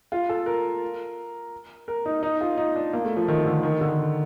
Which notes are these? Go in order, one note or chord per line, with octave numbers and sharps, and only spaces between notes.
F4
A4
A#4
A#4
D#4
D#4
F4
D#4
D4
A#3
A3
F3
D#3
D3
D#3
D3